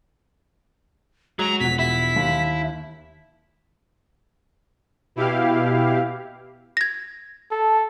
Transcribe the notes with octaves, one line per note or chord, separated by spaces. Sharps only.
F#3 G#3 A#5
E1 F3 F#5 B6
E4 B6
D#2 F5
B2 E4 G4 F5
G#6 A#6
A4 A5